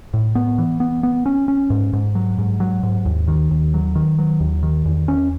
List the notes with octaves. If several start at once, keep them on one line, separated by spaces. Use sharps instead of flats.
A2
B3
E3
B3
B3
C#4
C#4
G#2
G#2
F#3
G#2
F#3
G#2
D#2
D#3
D#2
F#3
D#3
F#3
D#2
D#3
E2
C#4